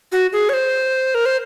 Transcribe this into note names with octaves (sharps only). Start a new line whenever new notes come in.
F#4
G#4
C#5
C5
A#4
C5